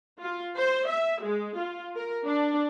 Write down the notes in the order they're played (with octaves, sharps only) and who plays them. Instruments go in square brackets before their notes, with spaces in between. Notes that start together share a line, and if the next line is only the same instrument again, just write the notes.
[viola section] F4
C5
E5
G#3
F4
A#4
D4